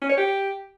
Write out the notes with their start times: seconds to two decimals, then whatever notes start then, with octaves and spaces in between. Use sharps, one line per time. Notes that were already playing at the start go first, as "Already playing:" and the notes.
0.02 C#4
0.10 C#5
0.18 G4